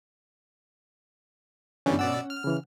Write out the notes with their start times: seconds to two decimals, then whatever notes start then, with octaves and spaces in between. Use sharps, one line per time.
1.86 G1 D3 E3 G3 C#4 D4
1.99 B2 D5 F#5 E6
2.30 F6
2.44 C#3 E3